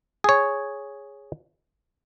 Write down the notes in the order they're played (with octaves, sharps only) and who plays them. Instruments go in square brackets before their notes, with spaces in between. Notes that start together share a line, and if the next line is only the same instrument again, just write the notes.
[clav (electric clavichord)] G#4 C#5